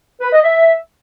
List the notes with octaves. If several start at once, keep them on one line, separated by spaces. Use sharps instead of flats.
B4
D#5
E5